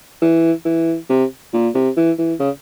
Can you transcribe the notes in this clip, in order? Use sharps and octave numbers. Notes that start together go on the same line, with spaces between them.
E3
E3
C3
A#2
C3
E3
E3
C#3